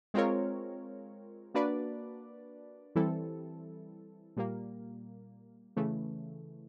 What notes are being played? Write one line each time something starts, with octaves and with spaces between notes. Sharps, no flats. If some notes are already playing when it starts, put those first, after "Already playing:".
G#3 C4 F4 A#4 C#5
A#3 D4 F#4 B4 D5
E3 G3 C4 E4 A4
A#2 G3 A#3
C#3 E3 A3